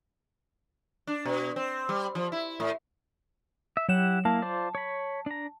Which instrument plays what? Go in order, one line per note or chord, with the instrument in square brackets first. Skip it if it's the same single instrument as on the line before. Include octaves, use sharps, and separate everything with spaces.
[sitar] D4
B2
C4
G3
F3
E4
A2
[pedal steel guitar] E5
[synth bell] F#3 E7 [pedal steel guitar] E4 G4 F#5
[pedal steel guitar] A#3 E4 F5 [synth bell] A5
[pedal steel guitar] F4 C5 D5
C#5 B5
D4 A#5